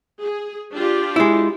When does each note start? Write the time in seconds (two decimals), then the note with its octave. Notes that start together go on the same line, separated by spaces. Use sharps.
0.20 G#4
0.74 D4 F4 G4
1.16 G#3 E4